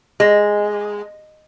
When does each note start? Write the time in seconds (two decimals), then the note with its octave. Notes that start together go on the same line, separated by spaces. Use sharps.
0.20 G#3